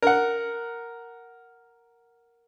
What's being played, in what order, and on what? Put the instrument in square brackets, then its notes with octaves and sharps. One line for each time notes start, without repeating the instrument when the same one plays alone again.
[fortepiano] A#4 F#5